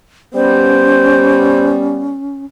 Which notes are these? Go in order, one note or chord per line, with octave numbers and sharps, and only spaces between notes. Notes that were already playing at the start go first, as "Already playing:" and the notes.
G3 B3 C#4 C5